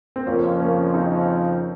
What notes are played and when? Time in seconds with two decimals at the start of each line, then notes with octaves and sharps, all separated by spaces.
0.16 C4
0.27 F2 C#3 F3 A#3 C#4
0.60 A#3 C#4
0.94 C4 D#4